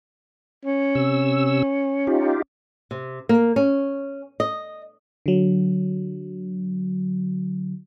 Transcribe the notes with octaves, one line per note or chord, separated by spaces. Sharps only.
C#4
C3 E6
D#4 F4 G4
C3
A#3
C#4
D#5
D3 F#3